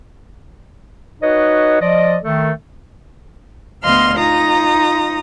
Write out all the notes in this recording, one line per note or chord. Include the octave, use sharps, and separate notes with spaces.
D#4 F#4 B4 C#5 D#5
F3 D5 D#5
D#3 A3 A4
D2 B3 D#5 F5 C6 F6
D#4 F4 A#5 D#6